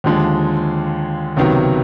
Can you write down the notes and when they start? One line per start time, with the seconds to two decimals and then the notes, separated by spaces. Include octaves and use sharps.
0.04 D#2 D3 F3 G#3
1.36 C#2 C3 D#3 F#3 B3